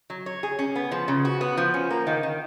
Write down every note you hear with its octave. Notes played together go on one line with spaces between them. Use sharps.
F#3
C#5
G#4
C#4
B3
F3
C#3
F#4
B3
F3
C#4
A#3
D#3
D#3